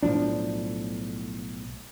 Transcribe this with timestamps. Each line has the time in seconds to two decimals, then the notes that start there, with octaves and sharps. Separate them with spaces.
0.03 B1 A2 F3 D4